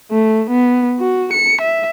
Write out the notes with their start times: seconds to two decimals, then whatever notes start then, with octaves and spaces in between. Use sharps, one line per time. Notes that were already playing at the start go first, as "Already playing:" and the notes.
0.11 A3
0.50 B3
1.00 F#4
1.33 C#7
1.61 E5